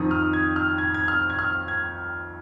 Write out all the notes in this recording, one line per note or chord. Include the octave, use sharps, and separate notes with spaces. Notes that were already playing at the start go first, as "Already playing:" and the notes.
Already playing: F2 D#3 D#6
F6
G#6
F6
G#6
G#6
F6
G#6
F6
G#6